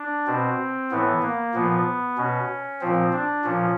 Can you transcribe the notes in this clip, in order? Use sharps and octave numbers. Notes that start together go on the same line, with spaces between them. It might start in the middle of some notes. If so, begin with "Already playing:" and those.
Already playing: D4
B2 C4
A2 E3 B3
A#3
A#2 F3 B3
B2 C#4
A#2 F3 C4
D4
A#2 F3 C#4